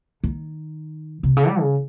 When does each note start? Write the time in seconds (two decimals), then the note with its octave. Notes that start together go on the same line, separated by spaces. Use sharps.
0.24 D#3
1.23 C3
1.37 C#3
1.48 G3
1.61 C#3